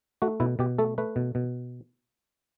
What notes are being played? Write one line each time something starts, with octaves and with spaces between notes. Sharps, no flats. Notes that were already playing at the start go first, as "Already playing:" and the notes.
A3 F#4
B2 E4
B2 G4
A3 A4
A3 B4
B2
B2